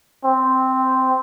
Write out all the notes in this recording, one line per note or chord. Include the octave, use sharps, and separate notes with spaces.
C4